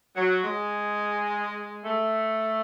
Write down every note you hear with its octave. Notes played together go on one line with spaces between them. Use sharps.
F#3
G#3
A3